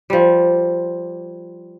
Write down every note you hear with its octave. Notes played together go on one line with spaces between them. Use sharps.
F3 G3